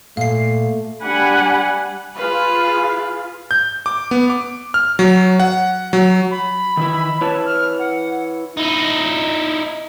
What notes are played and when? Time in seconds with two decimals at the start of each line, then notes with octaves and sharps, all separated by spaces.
0.17 A#2 A3 F5 C7
1.03 G3 D4 F#5 G#5 B5
2.16 F4 G#4 B4 F5
3.51 G6
3.86 D6
4.11 B3
4.30 D6
4.74 F6
4.99 F#3
5.40 F#5
5.93 F#3
6.31 B5
6.77 D#3 E3 E4
7.21 E4 B4 C#5 A5
7.46 F6
7.79 F#5
8.57 D#4 E4